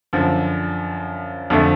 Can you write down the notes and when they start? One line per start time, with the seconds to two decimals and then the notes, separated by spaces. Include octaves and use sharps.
0.13 F#2 D3 F3
1.50 F2 D3 F3 A3